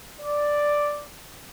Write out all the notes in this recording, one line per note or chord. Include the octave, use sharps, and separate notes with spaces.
D5